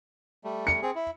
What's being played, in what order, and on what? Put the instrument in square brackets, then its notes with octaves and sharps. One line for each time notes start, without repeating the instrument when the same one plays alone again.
[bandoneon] G3 A3
[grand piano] C#7
[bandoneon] C4 G#4
E4